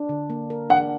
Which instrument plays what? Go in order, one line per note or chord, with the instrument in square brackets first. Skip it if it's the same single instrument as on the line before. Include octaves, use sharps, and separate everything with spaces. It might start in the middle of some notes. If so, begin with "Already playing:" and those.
Already playing: [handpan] D4
D3
A#3
A#4
[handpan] D4 [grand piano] F#5